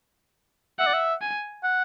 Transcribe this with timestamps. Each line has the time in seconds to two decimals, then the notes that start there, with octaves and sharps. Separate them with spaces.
0.79 E5 F#5
0.87 D5
0.94 E5
1.21 G#5
1.63 F#5